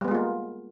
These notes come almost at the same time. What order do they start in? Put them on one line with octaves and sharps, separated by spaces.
G3 B3 G#3 F4 A#3